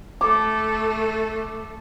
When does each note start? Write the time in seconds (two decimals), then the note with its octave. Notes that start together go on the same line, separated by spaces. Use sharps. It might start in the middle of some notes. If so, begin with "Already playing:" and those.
0.21 A3 A4 D6